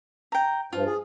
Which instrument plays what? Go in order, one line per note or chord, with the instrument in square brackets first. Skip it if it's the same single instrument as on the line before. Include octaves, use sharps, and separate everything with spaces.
[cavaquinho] G5 A#5
[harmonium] G2 F3 [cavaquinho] F4
[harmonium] G#4